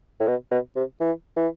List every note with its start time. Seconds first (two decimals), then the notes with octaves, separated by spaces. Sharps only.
0.20 A2
0.27 B2
0.51 B2
0.76 C3
1.00 E3
1.36 E3